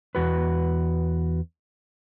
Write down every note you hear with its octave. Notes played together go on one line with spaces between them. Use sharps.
E2 F#4 B4